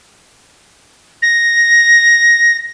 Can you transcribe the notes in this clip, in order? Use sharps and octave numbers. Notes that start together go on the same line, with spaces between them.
A#6